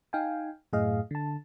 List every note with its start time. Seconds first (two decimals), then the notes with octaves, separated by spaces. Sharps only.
0.13 D#4 F5 G5 G#5
0.73 F#2 A2 G#4 D#5 F5
1.11 D3 A5